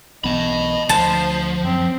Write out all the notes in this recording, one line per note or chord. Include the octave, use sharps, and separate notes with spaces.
B1 E3 B3 D#5 A5 B5
D2 F3 C5 A5
F#2 C4